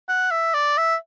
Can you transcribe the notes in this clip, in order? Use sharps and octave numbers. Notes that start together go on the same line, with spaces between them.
F#5
E5
D5
E5